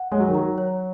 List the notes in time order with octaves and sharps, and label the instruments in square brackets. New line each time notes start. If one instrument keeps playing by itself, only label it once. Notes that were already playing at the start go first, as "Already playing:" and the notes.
Already playing: [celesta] F#5
[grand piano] G#3 [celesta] C#5
[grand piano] F#3
D#3
[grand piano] F#3 [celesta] A#5
[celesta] C#5